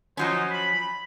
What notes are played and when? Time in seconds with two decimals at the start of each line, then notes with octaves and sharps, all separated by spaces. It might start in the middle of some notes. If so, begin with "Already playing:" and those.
0.17 F3 F#3 C#4 D#4 C5
0.51 B5